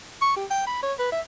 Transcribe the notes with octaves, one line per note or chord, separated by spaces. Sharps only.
C#6
G4
G5
B5
C#5
B4
E5